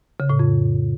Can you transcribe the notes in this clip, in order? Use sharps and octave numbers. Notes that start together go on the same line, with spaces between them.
C#3
A2
F2